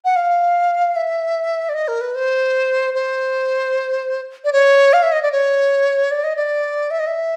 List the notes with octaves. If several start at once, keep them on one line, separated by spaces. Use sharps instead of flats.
F#5
F5
E5
D5
D#5
A#4
B4
C5
C5
D5
C#5
F5
E5
D#5
D5
C#5
D5
D#5
D5
E5
D#5
E5